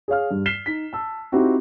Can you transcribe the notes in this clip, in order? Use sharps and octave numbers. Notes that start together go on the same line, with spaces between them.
G#4 C#5 F5 F6
G2
F6 B6 C7 E7 G7
D#4 B6
A5 E6
C4 D#4 E4 F#4 G4